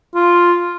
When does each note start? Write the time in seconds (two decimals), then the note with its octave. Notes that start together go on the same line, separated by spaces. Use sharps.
0.15 F4